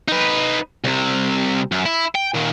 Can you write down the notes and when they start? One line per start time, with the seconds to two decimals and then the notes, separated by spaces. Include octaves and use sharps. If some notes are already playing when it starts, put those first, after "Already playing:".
0.08 D#4 B4
0.84 C2 C3
1.72 F#2
1.86 E4
2.15 G5
2.35 A#2 D#3